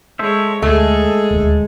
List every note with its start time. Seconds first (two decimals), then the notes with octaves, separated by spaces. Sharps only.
0.19 G#3 A4 C5 C#5 E5
0.62 D2 G#3 A3 G#4 A4
1.30 D#1 D2